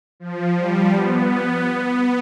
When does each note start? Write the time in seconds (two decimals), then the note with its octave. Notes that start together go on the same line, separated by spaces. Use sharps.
0.20 F3
0.57 G3
0.93 B3
1.30 B3
1.67 B3